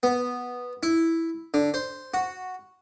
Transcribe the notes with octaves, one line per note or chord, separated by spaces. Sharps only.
B3
E4
D3
C5
F#4